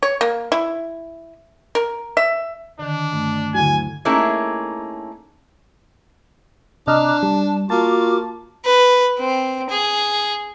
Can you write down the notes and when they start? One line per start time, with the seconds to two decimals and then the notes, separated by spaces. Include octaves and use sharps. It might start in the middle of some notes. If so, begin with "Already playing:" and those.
0.03 C#5
0.21 A#3
0.52 E4
1.75 A#4
2.17 E5
2.79 D3 D#3 D4
3.13 G2 A3
3.54 D2 F#3 E4 G#5
4.05 A3 A#3 C#4 D#4 E4 G#4
6.87 C3 D4 D#5 A#5 D6 F6 F#6
7.23 G3 A5
7.70 A#3 F4 F#4 A5 D6
8.65 B4
9.19 C4
9.70 G#4